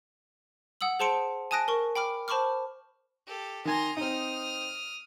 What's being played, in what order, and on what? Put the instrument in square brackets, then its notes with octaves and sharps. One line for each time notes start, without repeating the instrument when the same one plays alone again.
[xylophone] F#5 D#6 E6 F#7
G#4 C5 A5 C6 C#7 D7
G#5 A5 D#6 F#6 A#6 D7
A#4 C#6
G5 B5 D6 F6
C5 A5 B5 C#6 D6 F6
[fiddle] G4 A4
[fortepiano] D#3 G#5 [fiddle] A#5 C6
[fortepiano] C4 D#4 [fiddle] D#6 F6